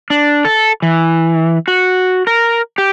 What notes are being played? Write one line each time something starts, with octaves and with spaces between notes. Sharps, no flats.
D4
A4
E3
F#4
A#4
G4